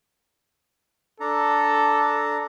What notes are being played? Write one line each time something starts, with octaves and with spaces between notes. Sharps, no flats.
D4 A4 A#5